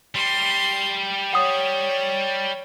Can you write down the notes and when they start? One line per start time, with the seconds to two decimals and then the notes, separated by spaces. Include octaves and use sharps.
0.15 G3 C6
1.33 C#5 F#5 D#6